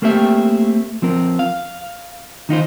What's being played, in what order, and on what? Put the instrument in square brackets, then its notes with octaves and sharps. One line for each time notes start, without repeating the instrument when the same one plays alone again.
[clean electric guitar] A3 A#3 C4 G4 E5
F3 C4 A#4
F5
D#3 D#4 F4 C5